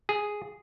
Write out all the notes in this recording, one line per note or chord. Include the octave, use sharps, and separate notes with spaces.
G#4